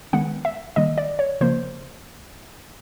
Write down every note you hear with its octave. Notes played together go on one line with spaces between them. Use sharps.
D#3 G#3 B3 F#5
E5
D#3 G3 A#3 D#5
D5
C#5
C#3 F3 A#3 C5